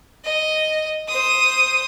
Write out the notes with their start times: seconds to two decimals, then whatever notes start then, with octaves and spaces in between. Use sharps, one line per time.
0.25 D#5
1.08 C5 D#6